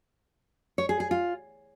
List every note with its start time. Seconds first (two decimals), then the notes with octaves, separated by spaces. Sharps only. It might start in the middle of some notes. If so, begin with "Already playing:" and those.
0.78 C#5
0.89 G#4
1.00 G#4
1.11 F4